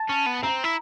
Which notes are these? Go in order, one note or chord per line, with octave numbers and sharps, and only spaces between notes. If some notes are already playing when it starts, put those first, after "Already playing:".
Already playing: A5
C#4
B3
C4 A#5
E4